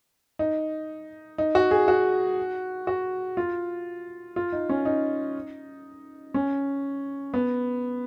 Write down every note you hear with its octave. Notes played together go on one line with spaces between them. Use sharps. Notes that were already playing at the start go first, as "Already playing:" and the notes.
D#4
D#4
F#4
G#4
F#4
F#4
F4
F4
D#4
C#4
D#4
C#4
B3